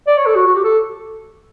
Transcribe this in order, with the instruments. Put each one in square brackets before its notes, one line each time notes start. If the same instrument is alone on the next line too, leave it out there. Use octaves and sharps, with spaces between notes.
[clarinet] D5
C#5
A4
F#4
F#4
G4
A4